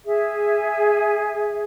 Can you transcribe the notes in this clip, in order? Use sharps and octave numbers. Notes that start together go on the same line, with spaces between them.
G#4 E5